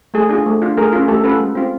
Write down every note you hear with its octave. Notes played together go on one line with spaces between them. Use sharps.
A3 G#4
D4 F4 G#4
A3
D4 F4
A3 G#4 A#4
C#4 F4
A3 G4 A4
C#4 F4 A4 B4
G#3
C4 F4